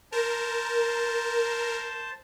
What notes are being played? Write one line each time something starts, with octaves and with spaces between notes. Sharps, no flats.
A#4 C5 A5